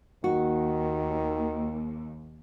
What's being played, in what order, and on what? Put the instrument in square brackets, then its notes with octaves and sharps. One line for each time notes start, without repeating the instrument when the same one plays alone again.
[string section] D#2 [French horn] D#3 [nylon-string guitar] F#4